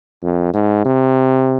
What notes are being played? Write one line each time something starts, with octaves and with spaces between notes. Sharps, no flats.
F2
G#2
C3